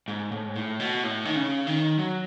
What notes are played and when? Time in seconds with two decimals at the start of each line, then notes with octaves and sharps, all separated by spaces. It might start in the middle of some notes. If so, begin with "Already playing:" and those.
0.08 G#2
0.32 A2
0.45 G#2
0.56 A2
0.80 B2
1.03 A2
1.25 D#3
1.35 C#3
1.67 D#3
1.99 F#3